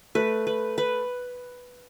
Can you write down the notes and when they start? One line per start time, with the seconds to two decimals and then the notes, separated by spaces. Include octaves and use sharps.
0.15 A3 B4
0.47 B4
0.78 B4